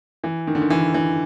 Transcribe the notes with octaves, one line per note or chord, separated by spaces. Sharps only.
E3
D#3
D3
D#3
E3
E3